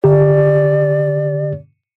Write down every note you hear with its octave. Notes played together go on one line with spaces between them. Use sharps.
D3 G4 D5